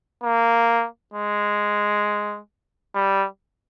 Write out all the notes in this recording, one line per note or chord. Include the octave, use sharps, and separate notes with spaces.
A#3
G#3
G3